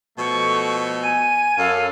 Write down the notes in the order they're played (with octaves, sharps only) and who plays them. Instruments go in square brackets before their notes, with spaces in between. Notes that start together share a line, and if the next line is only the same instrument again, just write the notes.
[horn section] B2 F3 A3 [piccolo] C#6
[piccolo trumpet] G#5 [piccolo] D#7
[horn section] F#2 A4 [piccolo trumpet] F5